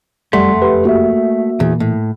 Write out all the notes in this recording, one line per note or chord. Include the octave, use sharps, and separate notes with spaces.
F#1 F2 G3 A3 E5 F#5 C6
G4 B4 C6
A#3 F#4 E5
E2 A#2 E3
A2